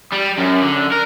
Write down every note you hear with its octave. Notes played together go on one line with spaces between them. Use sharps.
G3
F#2
D3
A#4